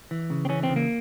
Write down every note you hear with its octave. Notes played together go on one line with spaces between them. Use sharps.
E3
C#3
C4
E3 C#4
C4
C#3
A#3